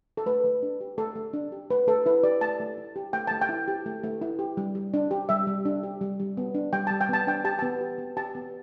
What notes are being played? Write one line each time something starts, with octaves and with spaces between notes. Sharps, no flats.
A4
A3 B4
A3
D4
G4
A3 A4
A3
D4
G4
A3 B4
A3 A4
E4 B4
G4 D5
A3 A5
A3
E4
G4
A3 G5
A3 A5
G5
E4
G4
A3
A3
E4
G4
G3
G3
D4
G4
G3 E5
G3
D4
G4
G3
G3
B3
D4
G3 G5
G3 A5
G5
B3 A5
D4 G5
G4 A5
B3 A5
G4
B3
G4 A5
B3